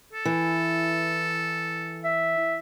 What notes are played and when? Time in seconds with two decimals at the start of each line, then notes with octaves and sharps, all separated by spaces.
0.13 A4
0.25 E3
2.04 E5